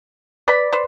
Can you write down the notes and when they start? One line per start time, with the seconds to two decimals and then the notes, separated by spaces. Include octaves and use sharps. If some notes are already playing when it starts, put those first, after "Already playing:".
0.48 B4 D5 B5
0.72 B4 C5